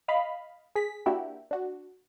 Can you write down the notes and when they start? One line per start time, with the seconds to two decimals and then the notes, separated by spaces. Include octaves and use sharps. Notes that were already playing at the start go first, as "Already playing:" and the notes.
0.08 D#5 F5 B5
0.76 G#4 B6
1.06 A#3 D4 E4 F#4 G4
1.51 D4 F#4